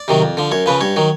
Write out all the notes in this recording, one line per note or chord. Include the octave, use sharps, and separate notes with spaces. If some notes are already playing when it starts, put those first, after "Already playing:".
Already playing: D5
C3 D#3 F#3
F2
D3 F3
F#2 C#5
C#3 F3 B4
G2 C#5
D#3 F#3